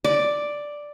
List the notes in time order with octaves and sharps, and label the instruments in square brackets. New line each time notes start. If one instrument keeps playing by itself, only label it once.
[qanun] D5